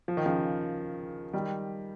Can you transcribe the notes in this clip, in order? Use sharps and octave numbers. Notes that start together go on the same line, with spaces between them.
F3
D#3
C#3 F3
D#3 G3